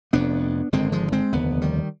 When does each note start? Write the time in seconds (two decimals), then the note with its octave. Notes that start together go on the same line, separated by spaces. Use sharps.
0.13 F1 F2 C3 B3 D4
0.73 G#1 G2 D3 G#3 C4
0.92 F3 G#3
1.12 G#3 C4
1.32 F1 D#2 D3 B3
1.61 D#3 G3